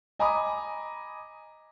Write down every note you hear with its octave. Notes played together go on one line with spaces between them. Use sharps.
D#5 G#5 A#5 B5 D6 D#6